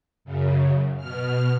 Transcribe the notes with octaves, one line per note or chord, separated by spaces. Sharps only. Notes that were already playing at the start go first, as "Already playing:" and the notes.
F#2 C#3
B2 F6